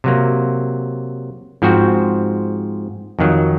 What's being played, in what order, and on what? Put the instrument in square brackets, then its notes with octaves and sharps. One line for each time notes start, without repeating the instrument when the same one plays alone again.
[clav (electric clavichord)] C3 F#3 A#3
G#2 F3 C4 F#4
F2 D#3 F#3